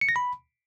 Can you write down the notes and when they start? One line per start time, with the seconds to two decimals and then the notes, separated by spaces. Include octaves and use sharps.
0.01 C#7
0.09 A#6
0.16 B5